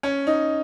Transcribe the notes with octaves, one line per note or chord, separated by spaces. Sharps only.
C#4
D#4